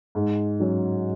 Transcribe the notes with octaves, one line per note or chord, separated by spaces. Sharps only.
G#2
F#3 C#4